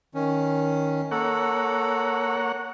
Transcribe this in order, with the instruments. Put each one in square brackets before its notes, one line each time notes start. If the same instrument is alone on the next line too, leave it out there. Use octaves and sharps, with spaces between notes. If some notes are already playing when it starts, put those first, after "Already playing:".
[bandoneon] D#3 C#4
[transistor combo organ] A#3 C#5 F#5 [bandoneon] A4